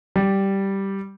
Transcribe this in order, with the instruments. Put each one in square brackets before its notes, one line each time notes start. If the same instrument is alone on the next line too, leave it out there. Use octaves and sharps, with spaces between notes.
[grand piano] G3